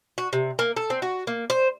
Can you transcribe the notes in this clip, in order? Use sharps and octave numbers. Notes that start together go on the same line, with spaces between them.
F#4
C3
A#3
A4
C4
F#4
A#3
C5